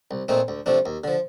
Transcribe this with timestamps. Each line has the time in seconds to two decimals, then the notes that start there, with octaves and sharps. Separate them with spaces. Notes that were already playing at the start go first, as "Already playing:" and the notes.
0.11 C2
0.28 A#2 A3 C4 D#4
0.48 D2
0.66 C3 F3 A3 D4
0.86 D#2
1.04 D3 F3